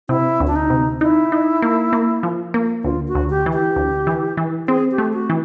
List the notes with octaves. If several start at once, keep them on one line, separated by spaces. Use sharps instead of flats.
C3 E4
D2
D4
D#4
C3
D#4 E4
D#4
A#3
A#3
F3
A#3
D2 F4
F#4
D2
G4
E3
G4
D2
E3
E3
C4 G#4
G4
A3
F#4
E3